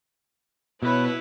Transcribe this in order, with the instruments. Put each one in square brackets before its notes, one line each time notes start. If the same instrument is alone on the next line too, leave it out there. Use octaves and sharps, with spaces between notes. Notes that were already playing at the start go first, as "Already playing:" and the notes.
[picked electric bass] B2 [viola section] E4 B4 C#5